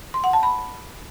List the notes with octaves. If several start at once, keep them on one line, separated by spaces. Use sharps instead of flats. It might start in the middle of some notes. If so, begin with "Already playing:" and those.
C6
F#5
A5
B5